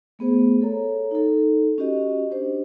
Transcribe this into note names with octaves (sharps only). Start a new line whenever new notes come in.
A3 B3 G#4 C5
A4 C#5 A#5
D#4 A4
C#4 F#4 G4 D#5
D4 G4 C5